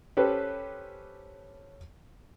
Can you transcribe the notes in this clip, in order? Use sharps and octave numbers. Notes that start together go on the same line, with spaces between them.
C#4 G4 A4 B4 C5